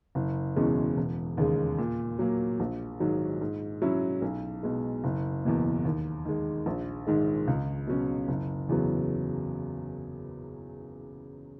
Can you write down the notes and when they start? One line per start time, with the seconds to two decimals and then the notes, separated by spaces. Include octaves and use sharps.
0.15 F#1
0.56 E2 B2 G#3 C#4
0.97 E1
1.37 D#2 C#3 G#3
1.78 A#2
2.19 F#3 A#3
2.60 A#1
3.00 G#2 D#3 F#3
3.41 G#2
3.82 F#3 C#4 E4
4.22 B1
4.63 B2 G#3
5.04 F#1
5.44 E2 B2 A#3
5.85 D#2
6.25 D#3 G#3
6.66 A#1
7.07 G#2 D#3 G#3
7.47 C#2
7.87 B2 F#3 C#4
8.28 F#1
8.69 E2 C#3 F#3 B3